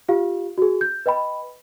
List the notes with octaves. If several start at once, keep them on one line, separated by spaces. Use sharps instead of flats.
F4 G4 F5
F#4 G#4
G6
B4 D#5 G5 B5